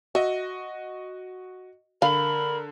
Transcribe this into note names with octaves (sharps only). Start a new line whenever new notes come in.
F#4 D#5 E5
D3 A#4 F5 B5